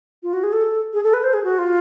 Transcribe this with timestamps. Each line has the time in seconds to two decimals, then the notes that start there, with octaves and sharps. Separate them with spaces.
0.23 F4
0.33 F#4
0.43 G#4
0.53 A4
0.94 G#4
1.03 A4
1.14 B4
1.24 C5
1.33 G#4
1.44 F#4
1.59 F4